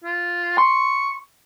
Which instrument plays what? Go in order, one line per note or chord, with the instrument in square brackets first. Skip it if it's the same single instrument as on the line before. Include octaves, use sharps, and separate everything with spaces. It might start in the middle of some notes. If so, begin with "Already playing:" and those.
[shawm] F4
[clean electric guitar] C6 [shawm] C#6